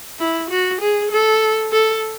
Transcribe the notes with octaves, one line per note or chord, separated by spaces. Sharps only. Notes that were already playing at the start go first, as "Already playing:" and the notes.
E4
F#4
G#4
A4
A4